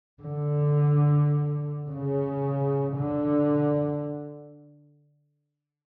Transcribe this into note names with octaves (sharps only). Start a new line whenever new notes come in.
D3
C#3
D3